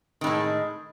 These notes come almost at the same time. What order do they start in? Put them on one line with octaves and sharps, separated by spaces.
D#3 A2 G#3